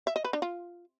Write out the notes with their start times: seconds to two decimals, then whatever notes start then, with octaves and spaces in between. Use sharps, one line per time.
0.07 E5
0.16 D#5
0.24 B4
0.33 D4
0.42 F4